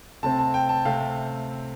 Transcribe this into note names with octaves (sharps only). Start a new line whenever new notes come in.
C3 A3 C4 A5
A5
G5
A5
C3 A3 C4 F5